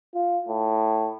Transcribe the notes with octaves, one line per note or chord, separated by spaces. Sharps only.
F4
A2